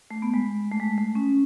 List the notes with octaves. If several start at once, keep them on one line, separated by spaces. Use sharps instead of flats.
A3
B3
G#3
A3
G#3
A3
C#4